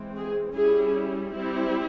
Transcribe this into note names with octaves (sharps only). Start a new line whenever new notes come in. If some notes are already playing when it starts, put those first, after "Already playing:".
Already playing: E3 G#3 C4
G#4
G3 C#4 E4 G#4
G3 C4 E4